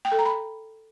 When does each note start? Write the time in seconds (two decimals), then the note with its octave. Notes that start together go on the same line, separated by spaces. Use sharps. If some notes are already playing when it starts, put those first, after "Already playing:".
0.05 G5
0.12 A4
0.19 A#5
0.25 B5